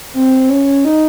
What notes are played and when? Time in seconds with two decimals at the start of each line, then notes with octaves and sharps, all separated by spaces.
0.14 C4
0.49 C#4
0.85 D#4